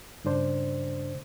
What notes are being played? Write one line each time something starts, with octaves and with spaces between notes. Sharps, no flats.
G2 C#3 D4 C5